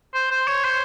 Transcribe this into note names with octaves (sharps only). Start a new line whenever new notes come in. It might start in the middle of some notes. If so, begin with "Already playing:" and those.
C5
C5
C#5
C5